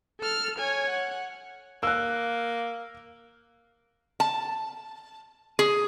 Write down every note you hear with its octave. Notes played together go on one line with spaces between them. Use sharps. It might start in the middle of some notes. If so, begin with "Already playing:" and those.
A4 F6
C#5 G#5
F#5
A#3 E6 F#6
A5
G#4